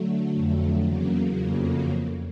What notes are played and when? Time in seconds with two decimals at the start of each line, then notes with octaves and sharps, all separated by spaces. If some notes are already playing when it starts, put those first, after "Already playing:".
Already playing: D3 F#3 A3
0.35 F2
0.86 E2 C#3 F#3 A#3
1.38 F2